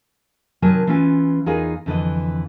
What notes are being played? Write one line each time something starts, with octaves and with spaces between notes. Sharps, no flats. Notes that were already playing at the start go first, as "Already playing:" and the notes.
C3 D#3 F#3 A#4 G#5 A5
E3 B3 C#4 F4
E2 D#4 F4 G#4 A#4 G#5
F2 D3 E3 D#5